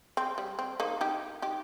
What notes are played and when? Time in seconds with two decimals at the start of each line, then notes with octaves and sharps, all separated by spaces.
0.17 C4
0.38 G3
0.59 C4
0.80 A#3 D#4
1.01 D#4 G4
1.42 D#4 G4